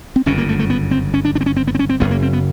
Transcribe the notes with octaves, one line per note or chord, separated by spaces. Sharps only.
C4
G1 F#2 C#3 C#4
A#3
A3
A3
B3
C4
C#4
D4
D4
C4
C#4
C4
B3
C4
C#4
C4
F#1 F#2 C#3 B3
A#3
C4
B3